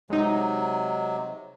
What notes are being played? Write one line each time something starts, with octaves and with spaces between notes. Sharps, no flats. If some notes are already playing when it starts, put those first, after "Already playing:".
C3 F#3 G#3 D#4